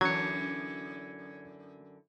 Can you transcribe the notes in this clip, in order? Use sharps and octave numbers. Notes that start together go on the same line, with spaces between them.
F#2 D3 E3 F#3 G#6 C#7